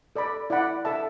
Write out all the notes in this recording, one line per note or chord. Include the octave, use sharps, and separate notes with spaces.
A4 D5 B5
E4 D5 F#5 B5
A4 E5 A5